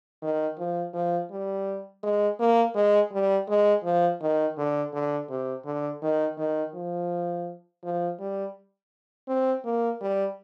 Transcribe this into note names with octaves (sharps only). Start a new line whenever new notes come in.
D#3
F3
F3
G3
G#3
A#3
G#3
G3
G#3
F3
D#3
D3
D3
C3
D3
D#3
D#3
F3
F3
G3
C4
A#3
G3